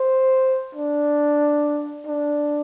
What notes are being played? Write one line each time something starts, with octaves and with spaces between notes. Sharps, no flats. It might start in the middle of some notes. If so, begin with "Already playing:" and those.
Already playing: C5
D4
D4